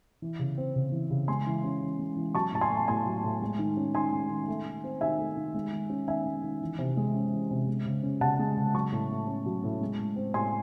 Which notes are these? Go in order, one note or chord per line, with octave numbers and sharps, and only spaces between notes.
E3
C#3
C4
C#3
E3
C#3
G#3 G#5 C6
E3
C#4
E3
G#3
E3
F#3 A5 C#6
A2 A5
G#5 C6
A3
A5
A2 G#5 C6
F#3
A2
G#3
D#3
C#4
D#3 G#5 C6
G#3
D#3
A3
D#3
C4
D#3 E5 G#5
A3
D#3
G#3
D#3
C#4
D#3 E5 G#5
G#3
D#3
E3
C3
G#3
C#4
E3
C3
G#3
C#3
C#4
C#3 F#5 A5
G#3
C#3
F#3 A5 C#6
A2
A3
C#4
F#3
A2
G#3
A2
C4
A2 G#5 C6